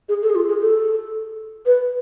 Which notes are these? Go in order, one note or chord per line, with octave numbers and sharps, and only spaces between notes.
G#4
A4
G#4
F4
G#4
A4
B4